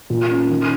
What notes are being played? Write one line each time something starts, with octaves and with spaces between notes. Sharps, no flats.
A#2
C#4
D#3